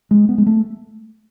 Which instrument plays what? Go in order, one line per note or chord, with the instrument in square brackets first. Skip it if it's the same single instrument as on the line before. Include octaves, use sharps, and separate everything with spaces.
[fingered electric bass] G#3
B3
G#3
A3